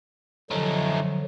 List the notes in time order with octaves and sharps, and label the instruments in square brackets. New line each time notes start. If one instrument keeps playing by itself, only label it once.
[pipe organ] D3 F3 F#3 [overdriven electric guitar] A3 D#4